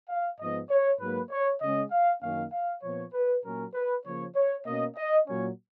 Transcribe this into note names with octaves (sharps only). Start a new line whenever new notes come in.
F5
G#2 F3 B3 D#5
C#5
G#2 F#3 A#3 B4
C#5
C#3 G#3 C#4 D#5
F5
F#2 D#3 A#3 C#4 F5
F5
A#2 F3 B3 C#5
B4
A#2 F#3 A#3 C#4 A#4
B4
C#3 F3 A#3 C#5
C#5
B2 A#3 C#4 D#5
D#5
A#2 F#3 A#3 C#4 C#5